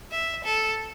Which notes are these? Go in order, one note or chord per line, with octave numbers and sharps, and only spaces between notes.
E5
A4